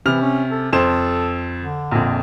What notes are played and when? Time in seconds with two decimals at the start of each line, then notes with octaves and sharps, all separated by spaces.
0.06 C3 E3 F6 F7
0.21 C#4
0.51 A4
0.73 F2 A4 C5 E7
1.62 D3
1.91 A#1 F2